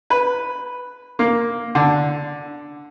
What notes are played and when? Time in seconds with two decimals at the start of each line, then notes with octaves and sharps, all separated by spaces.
0.10 B4
1.19 A#3
1.75 D3